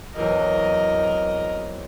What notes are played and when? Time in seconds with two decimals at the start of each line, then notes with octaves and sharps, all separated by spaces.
0.16 B1 E2 C4 A#4 D#5